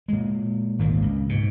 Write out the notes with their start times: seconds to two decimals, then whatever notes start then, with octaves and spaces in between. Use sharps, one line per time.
0.08 A#2 G#3
0.79 G#1 D2 A#3
1.02 C#2
1.29 G#2 B2